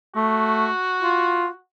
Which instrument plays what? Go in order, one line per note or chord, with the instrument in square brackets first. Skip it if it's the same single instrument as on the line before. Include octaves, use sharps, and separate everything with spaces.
[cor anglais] A3 [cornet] F#4
[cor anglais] F4